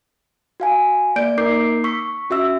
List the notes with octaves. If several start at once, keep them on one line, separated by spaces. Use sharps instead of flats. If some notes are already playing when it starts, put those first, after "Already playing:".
F#4 F5 G#5
A#3 D5 G6 D7
A#3 D#4 A#4 D6 G6 C7
C#6 E6 B6
C#4 F#4 E5 E6